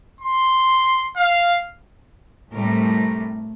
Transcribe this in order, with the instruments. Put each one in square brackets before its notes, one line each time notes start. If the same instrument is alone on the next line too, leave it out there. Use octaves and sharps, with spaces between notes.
[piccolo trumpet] C6
F5
[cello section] A2 C3 G3 A3 A#4